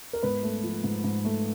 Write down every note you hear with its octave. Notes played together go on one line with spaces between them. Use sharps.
A#4
G#2 B3 B4
A3
F3
G#2
G#2
A3